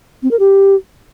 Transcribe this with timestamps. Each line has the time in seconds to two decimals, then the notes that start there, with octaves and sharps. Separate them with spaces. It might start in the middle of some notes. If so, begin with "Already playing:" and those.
0.23 C4
0.31 A#4
0.39 G4